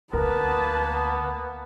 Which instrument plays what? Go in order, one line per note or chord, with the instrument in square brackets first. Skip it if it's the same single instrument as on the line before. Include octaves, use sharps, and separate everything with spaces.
[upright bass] D2 [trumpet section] A#3 B3 [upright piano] A#4 [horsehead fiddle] B4 A5